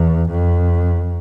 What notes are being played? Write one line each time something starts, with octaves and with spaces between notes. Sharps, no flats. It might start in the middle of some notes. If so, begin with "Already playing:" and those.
Already playing: E2
F2